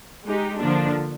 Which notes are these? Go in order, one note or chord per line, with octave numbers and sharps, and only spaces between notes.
G#3 D#4 G4
D3 F3 A#3 D4